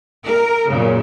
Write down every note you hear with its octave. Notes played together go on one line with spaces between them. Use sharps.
A#4
F#2 A#2 C#3